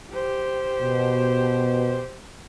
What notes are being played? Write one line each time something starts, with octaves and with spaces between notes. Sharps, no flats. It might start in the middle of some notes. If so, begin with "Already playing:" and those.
G4 C5
B2